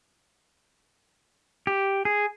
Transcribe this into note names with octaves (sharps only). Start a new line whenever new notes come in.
G4
G#4